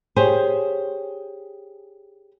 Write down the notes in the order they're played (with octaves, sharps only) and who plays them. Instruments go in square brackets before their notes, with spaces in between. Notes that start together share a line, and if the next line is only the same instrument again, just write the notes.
[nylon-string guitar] G4 G#4 C5 C#5